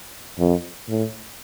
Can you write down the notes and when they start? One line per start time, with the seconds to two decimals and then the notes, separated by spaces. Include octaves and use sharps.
0.39 F2
0.89 A2